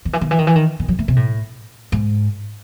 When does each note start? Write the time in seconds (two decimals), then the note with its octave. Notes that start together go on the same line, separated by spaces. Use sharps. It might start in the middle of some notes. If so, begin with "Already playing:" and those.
0.05 D#3
0.13 E3
0.21 D#3
0.31 E3
0.39 D#3
0.47 E3
0.56 D#3
0.80 D#3
0.88 F#3
0.99 A3
1.08 C3
1.16 A2
1.92 G#2